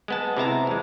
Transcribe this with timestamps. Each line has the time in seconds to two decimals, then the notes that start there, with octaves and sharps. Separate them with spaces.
0.08 G#3 B3 A5
0.37 C3 E4 A5 A#5
0.67 E2 G#3